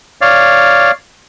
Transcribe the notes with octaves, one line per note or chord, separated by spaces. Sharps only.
C#5 D5 F5